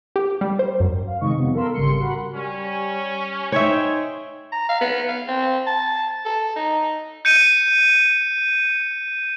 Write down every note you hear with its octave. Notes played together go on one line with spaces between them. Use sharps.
G4
G3
C5
F#2
F5
C3 D#3 G#3 D#5 C#6
F2 C3 F3 G3 B3 C#4
A4 A#4 F5 B5 C6 E6
G#1 C#3 G3 C6 C#7
F#4 A#4 F#5 B5
G3 C#4
D#4 G#4 C5 C#5 E5 G5
A#5
F5
B3
F5
C4
A5
A4
D#4
G6 C#7 D#7